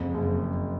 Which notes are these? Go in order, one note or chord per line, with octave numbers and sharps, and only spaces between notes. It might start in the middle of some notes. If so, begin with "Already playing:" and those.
Already playing: F#1 F2
F#1